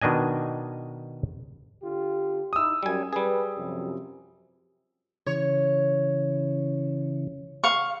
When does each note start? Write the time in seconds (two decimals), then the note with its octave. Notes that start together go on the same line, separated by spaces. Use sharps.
0.01 B2 D#3 D4 D#5 G#5
1.83 D3 F4 G4
2.53 D#4 E4 D#6 E6
2.83 F#2 G3 G#5
3.13 G3 G#4 B4
3.57 F#2 C3 F3
5.27 C#3 E3 C#5
7.64 F5 C#6